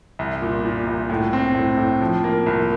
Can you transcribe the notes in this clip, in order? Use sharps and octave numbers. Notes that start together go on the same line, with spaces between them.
C2
A#2
A#2
C2
A2
C4
A2
A2
F3
A#3
C2